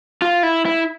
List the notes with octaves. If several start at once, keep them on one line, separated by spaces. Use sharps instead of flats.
F4
E4
E4